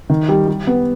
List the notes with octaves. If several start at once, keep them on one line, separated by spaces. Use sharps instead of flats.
D#3
G3
G3
B3